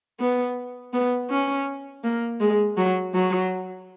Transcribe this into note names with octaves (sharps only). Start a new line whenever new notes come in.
B3
B3
C#4
A#3
G#3
F#3
F#3